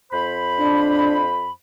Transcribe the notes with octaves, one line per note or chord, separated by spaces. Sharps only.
F2 C5 B5
D4